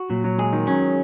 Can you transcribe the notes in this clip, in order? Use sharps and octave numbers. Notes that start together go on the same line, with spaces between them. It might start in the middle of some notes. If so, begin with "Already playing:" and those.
Already playing: F#4
A#2 F#3
F#3
G#3 G#4
D#3
F#3 C#4